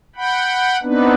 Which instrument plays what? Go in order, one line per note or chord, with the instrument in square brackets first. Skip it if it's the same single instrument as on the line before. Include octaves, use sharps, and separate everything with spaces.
[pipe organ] F#5 G5 B5
B3 C4 D4 D#4 B4